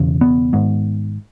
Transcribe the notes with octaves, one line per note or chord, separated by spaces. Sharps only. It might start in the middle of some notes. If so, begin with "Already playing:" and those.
Already playing: E1 E2 C#3
B3
G#1 G#2